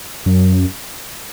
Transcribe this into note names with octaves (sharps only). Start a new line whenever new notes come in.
F#2